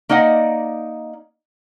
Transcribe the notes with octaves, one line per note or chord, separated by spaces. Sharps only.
A#3 D#4 D5 D#5 F#5